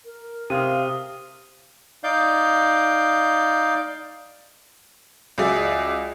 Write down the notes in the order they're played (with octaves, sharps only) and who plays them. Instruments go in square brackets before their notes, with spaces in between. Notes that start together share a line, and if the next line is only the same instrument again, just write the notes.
[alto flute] A#4
[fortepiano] C3 [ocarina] F5 [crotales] D#6 F6 D#7
[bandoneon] D#4 D5 F5 G6
[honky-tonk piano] C#2 F#3 G#4 D5 E5